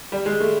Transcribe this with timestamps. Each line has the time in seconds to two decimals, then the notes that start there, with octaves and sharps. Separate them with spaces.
0.12 G3
0.26 G#3
0.40 A3